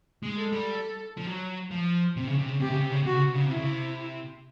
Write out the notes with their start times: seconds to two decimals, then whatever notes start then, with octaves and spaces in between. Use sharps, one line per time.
0.23 G#3
0.37 A4
0.52 G3
1.18 F3
1.27 F#3
1.71 F3
2.17 C3
2.27 C#3
2.38 C3
2.49 C#3
2.60 C3 G4
2.70 C#3
2.81 C3
2.91 C#3
3.03 C3 F#4
3.13 C#3
3.24 C3
3.34 C#3
3.46 C3
3.51 E4
3.56 C#3
3.67 C3